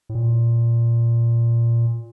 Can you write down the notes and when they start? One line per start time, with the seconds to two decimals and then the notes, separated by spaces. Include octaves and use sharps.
0.09 A2
0.15 A#2